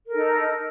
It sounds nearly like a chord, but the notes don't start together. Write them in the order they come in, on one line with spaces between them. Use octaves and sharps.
A#4 A4 D#4